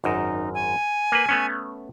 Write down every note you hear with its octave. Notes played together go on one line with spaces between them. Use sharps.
G#1 F#2 D#4
G#5
A#3 B4
A3 B3 C#4